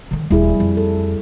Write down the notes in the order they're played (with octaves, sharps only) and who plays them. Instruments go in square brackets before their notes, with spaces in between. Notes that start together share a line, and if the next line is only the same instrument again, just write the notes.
[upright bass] D3 D#3
[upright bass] D#1 D2 [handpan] G3 E4 G#4
[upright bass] F2
[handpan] A4